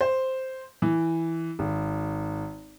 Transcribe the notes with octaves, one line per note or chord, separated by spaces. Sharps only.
C5
E3
G#1